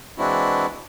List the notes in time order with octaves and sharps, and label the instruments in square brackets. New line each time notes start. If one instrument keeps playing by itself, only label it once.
[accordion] E3 G#3 C4 D4 E4 F#4